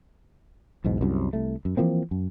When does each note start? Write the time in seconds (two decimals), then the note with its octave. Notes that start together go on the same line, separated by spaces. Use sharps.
0.84 B1 E2 G#2 B2
1.01 C2 F#2
1.33 C2 A3
1.65 F#2
1.77 E3 F3 A#3 C4
2.11 F#2